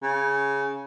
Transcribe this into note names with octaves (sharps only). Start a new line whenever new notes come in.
C#3